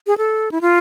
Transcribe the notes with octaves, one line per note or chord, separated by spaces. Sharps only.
G#4
A4
E4
F4